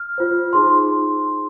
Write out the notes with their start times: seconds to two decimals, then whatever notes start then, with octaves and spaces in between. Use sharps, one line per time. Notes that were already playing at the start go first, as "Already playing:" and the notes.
Already playing: F6
0.18 F4 C5
0.53 D#4 G#4 C5 C6
0.70 C6